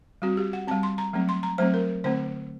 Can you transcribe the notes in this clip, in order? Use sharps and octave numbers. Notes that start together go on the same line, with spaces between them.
G3 C4 F#4
G4
F#5
G3 C4 A5
C6
A#5
F#3 A3 C4
C6
A#5
F#3 A3 C4 C5
A#4
D3 A3 C4 C5